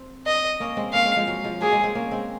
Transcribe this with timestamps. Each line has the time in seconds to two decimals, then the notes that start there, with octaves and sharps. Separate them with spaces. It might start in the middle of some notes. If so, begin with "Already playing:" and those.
Already playing: C4
0.27 D#5
0.60 A#3 C#4
0.77 G#3 C4
0.93 A#3 C#4 F5
1.05 G#3 C4
1.16 F3 G#3
1.27 F#3
1.44 F3 G#3
1.61 F#3 A#3 G#4
1.72 G#3 C4
1.83 G#3 C4
1.95 A#3 C#4
2.11 G#3 C4